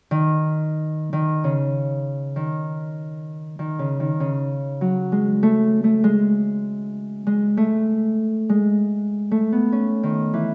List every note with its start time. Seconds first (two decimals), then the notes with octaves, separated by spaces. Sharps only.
0.11 D#3
1.13 D#3
1.44 C#3
2.36 D#3
3.59 D#3
3.79 C#3
4.00 D#3
4.20 C#3
4.81 F#3
5.12 G#3
5.43 A3
5.84 A3
6.04 G#3
7.27 G#3
7.57 A3
8.49 G#3
9.31 A3
9.52 B3
9.72 C#4
10.03 D#3
10.34 E3